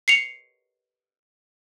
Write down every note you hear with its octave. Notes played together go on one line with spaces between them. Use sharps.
C7 C#7 F7